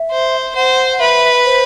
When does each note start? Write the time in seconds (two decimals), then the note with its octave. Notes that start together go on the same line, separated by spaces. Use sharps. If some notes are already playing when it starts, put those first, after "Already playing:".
Already playing: E5
0.11 C5
0.55 C5 F#5
0.92 F#5
1.00 B4 E5
1.45 C5